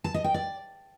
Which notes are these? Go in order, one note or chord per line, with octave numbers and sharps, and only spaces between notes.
A5
D#5
G5
D5